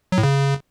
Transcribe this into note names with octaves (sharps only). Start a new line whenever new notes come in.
F#3
A2
C#3